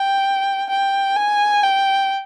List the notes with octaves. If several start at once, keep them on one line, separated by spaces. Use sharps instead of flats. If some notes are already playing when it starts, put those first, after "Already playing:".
Already playing: G5
G5
G#5
G5